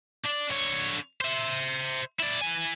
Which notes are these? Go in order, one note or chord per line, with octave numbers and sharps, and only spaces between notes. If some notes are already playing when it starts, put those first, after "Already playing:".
D4
D3 C#5
C5 E5
E4 D5
E3 G#5